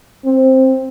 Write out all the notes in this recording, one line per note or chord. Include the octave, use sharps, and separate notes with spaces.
C4